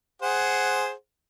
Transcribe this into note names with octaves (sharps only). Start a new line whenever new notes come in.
G#4 C5 F#5